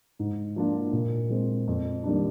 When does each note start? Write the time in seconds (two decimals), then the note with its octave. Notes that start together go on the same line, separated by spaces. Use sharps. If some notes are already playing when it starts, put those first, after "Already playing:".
0.19 G#2
0.56 F3 A#3 D4 F4
0.93 A#2
1.30 G#3 C4
1.68 F2
2.04 D#3 G3 A#3 D4